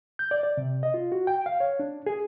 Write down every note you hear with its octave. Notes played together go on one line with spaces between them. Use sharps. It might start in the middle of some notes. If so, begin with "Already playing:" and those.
G6
D5
D5
C3
D#5
F4
F#4
G5
F5
C#5
D4
G#4